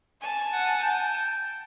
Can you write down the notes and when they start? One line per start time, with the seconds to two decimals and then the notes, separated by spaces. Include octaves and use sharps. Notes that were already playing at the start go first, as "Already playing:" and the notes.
0.20 G#5 A5
0.53 F#5
0.82 G5